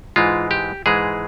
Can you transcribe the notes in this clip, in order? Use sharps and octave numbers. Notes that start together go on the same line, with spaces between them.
G#2 E3 G#3 F4
G4
G#2 E3 G#3 G#4